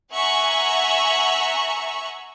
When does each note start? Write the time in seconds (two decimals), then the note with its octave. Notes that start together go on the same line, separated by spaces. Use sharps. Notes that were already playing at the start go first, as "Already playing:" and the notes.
0.14 E5 F#5 G#5 A#5 C#6 F#6